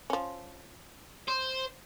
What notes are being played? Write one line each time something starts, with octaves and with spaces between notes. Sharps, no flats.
F3 C#4
C5